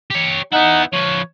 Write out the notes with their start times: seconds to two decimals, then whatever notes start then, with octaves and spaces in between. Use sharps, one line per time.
0.10 G4 C#5
0.53 B3 D#4 E4 F#5
0.93 F3 B4 C#5